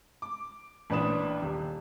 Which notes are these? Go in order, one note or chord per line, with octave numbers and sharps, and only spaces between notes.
D6
A1 A#2 D4 B4 D#6 E7
D#1